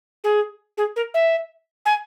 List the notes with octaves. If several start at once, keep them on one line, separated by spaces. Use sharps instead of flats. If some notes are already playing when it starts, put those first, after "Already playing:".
G#4
G#4
A#4
E5
G#5